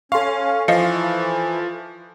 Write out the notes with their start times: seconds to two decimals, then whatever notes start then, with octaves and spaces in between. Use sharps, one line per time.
0.12 C#4 A4 F5 C6 C#6
0.68 E3 F3 D#5 F5 C#7